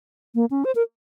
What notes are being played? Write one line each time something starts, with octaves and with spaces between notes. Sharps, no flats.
A#3
C#4
C5
A#4